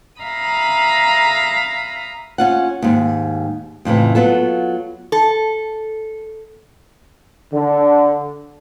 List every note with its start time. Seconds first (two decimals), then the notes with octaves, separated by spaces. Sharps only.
0.23 E5 F5 A#5 B5 D#6
2.38 C#4 F4 F#5
2.82 D#2 G#2
3.85 F2 A2 C#3 E3
4.15 F#3 B3 F4 A4
5.12 A4
7.53 D3